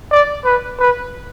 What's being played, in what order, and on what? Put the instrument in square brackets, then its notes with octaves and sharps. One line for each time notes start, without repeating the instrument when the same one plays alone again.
[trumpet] D5
B4
B4